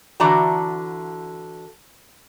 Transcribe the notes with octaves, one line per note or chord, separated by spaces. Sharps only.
D3 E3 F#4 D5 A5 A#5